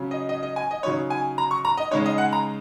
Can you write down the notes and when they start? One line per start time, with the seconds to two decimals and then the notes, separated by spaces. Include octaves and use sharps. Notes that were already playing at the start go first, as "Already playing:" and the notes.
Already playing: C#3 F#3 C#4
0.11 D#5
0.29 D#5
0.43 D#5
0.56 G#5
0.71 D#5
0.83 C#3 F#3 D#4 C#5
1.10 G#5
1.38 A#5
1.51 C#6
1.65 A#5
1.77 D#5
1.91 C#3 G#3 D#4 C#5
2.06 D#5
2.18 F#5
2.33 A#5